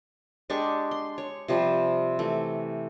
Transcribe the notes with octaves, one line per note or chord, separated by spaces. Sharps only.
G#3 D4 G4 C#6
C6
C#5
C3 F3 G3
E3 A3